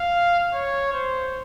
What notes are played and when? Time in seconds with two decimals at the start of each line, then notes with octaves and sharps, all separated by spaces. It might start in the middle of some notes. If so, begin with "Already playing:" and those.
Already playing: F5
0.53 C#5
0.92 C5